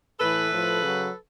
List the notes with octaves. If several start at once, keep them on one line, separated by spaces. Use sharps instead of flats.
A2 E3 A4 B4
A2 F3
C#3 F#3